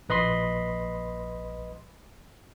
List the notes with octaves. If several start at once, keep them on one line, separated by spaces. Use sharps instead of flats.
A#1 B4 D#5 B5 C6